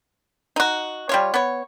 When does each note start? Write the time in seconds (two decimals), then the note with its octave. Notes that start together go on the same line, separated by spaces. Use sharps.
0.56 D#4 F#4
1.09 G3 F4 C#5
1.34 B3 C#5